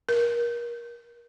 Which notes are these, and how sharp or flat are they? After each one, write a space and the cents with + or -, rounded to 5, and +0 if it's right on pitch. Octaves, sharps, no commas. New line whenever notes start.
A#4 +25